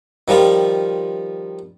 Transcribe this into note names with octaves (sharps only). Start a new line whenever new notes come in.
D#3 F3 G3 F4